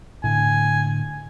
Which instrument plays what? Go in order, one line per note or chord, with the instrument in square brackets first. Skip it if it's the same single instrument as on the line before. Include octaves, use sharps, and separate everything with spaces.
[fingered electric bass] A2 D3 [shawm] G#5